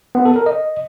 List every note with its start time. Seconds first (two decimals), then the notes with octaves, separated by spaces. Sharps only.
0.15 B3
0.25 A4
0.36 A#4
0.46 D#5